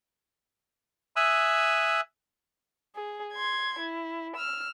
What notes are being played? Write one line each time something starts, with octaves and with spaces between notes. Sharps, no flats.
E5 G#5 D#6 E6 F#6
G#4
C6 G#6
E4
E6 F6